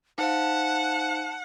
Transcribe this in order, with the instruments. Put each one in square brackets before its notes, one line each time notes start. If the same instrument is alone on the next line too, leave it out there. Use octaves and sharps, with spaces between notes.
[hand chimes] D#4 C5 F5 [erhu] F#5 [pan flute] A5